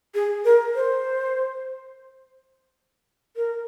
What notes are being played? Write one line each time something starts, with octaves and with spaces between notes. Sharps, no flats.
G#4
A#4
C5
A#4